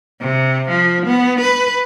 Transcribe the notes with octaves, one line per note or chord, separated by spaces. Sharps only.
C3
F3
B3
B4